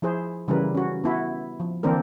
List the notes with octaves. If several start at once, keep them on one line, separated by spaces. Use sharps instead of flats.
F3 E4 G#4 C5
C#3 E3 G3 E4 A#4 B4
C#4 F#4
B3 E4 F#4
F3
D3 E3 A#3 C4 D4 A#4